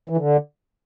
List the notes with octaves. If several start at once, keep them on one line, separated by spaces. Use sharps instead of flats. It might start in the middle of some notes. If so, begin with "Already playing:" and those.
E3
D3